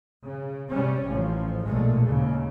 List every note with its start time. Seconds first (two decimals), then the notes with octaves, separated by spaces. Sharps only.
0.25 C#3
0.72 C3 G3 C#4
1.10 A1 F3
1.64 B1 A#2 G#3 A3
2.06 D#2 C#3